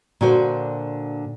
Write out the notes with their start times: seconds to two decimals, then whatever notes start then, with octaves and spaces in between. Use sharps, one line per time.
0.21 A#2 D3 F#4 C5